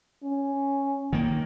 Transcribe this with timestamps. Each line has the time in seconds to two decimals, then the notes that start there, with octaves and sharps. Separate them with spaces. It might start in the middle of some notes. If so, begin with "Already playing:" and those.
0.24 C#4
1.13 D#3 A#3